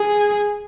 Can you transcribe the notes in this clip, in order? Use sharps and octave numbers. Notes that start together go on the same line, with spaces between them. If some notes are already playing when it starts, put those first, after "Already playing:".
Already playing: G#4